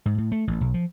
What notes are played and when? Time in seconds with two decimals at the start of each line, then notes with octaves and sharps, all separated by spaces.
0.06 G#2
0.18 A2
0.32 A3
0.47 A1
0.61 B1
0.74 F3